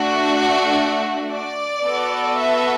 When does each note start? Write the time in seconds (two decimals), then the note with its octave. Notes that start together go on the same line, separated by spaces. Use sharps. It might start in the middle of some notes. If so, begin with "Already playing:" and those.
Already playing: A3 D4 F#4
1.32 D5
1.85 B3 F#4 A4
2.36 E5